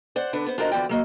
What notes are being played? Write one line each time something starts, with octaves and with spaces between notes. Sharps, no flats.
C5 D5 F#5
D3 B3 D4
B3 C5
D4 F4 F#4 A#4 C5 D#5
E2 D3 F3 F#4 D5 G5
F#3 A#3 D#5